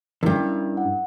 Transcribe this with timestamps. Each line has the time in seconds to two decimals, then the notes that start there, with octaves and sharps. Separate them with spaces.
0.23 E2 G2 C#4 E4 A#4
0.77 F#5